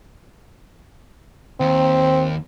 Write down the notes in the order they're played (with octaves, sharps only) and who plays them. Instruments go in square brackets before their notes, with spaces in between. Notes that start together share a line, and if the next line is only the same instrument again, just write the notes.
[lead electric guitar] D#2 [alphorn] C4